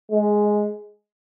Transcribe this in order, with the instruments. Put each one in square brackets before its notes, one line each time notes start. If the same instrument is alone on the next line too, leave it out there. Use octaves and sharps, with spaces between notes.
[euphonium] G#3